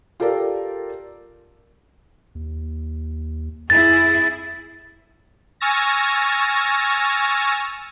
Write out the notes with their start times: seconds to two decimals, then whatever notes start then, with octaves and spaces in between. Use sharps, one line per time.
0.20 F4 G4 A4 A#4 D5
2.35 D#2
3.70 F2 E4 G#4 A6
5.60 G#5 C#6 E6 F6 A6 A#6